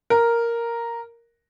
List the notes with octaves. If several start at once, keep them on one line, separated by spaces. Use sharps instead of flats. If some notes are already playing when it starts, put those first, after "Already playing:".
A#4